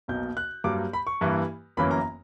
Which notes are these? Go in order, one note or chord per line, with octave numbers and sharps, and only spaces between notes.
B1 B2 A#3 G6
F#6
G2 F#3 A#3 D6
B5
C#6
G2 E3 A#3 E4
G1 F#2 E3 A#3 C#4 B5
A#5